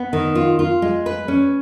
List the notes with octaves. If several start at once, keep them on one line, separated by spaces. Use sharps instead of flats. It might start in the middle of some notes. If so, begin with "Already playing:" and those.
Already playing: B3
D#3
F4
F4
G#3
B4
C#4